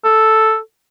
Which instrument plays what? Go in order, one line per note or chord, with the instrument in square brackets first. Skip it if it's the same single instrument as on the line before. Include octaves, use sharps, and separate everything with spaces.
[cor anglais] A4